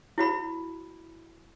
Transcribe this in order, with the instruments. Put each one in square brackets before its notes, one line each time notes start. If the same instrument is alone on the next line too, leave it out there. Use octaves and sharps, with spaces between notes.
[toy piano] E4 F#4 B5